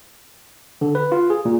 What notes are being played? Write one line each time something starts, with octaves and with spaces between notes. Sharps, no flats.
D3
B4
F4
G#4
A#2